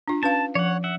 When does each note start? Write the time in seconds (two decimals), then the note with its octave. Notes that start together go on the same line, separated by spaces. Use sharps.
0.08 D4 F4
0.23 C#4 B4 F5 A5
0.55 F3 C#5 F#5
0.84 E5 F#5